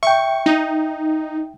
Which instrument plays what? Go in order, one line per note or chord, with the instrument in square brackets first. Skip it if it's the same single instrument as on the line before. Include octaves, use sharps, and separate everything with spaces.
[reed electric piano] E5 G5 [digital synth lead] C#6
[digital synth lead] D#4